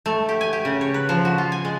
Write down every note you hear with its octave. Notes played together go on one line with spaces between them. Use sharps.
A3
G4
G#5
G4
C#3
C#5
B4
F3
F#4
F4
G#5
G#3